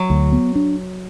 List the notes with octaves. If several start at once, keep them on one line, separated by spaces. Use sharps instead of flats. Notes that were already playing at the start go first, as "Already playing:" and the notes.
Already playing: F#3
D2
B3
D4